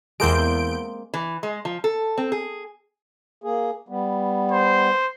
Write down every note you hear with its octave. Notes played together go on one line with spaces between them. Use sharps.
E2 G#3 A#3 C4 G6 D7
E3
G#3
F3
A4
C4
G#4
A#3 G#4
G3 B3
C5